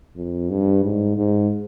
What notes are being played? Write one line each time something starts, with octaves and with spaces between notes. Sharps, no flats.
F2
G2
G#2
G#2